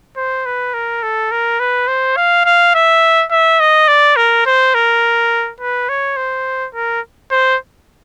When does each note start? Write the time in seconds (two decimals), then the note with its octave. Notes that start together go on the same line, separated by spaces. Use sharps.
0.17 C5
0.45 B4
0.74 A#4
1.03 A4
1.31 A#4
1.60 B4
1.88 C5
2.16 F5
2.45 F5
2.74 E5
3.31 E5
3.60 D#5
3.88 D5
4.16 A#4
4.46 C5
4.75 A#4
5.60 B4
5.89 C#5
6.16 C5
6.75 A#4
7.31 C5